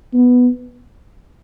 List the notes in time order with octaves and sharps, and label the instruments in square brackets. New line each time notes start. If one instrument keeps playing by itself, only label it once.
[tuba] B3